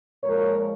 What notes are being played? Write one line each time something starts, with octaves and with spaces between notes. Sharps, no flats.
A#2 F3 G#3 A#4 C#5